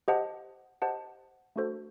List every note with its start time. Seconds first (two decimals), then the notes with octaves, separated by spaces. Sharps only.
0.08 G4 C5 D#5 F#5 A5
0.82 G4 C5 D#5 F#5 A5
1.56 A3 D4 F#4 A4 C5